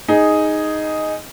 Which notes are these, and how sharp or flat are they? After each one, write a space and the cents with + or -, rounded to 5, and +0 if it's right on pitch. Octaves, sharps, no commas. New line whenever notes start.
D#4 +0 G#4 +0